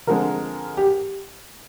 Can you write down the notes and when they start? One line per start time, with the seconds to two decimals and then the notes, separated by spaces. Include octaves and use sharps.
0.07 D3 F3 G#3 C4 A#4
0.77 G4